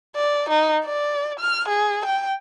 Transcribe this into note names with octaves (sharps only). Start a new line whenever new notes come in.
D5
D#4
D5
F6
G#4
G5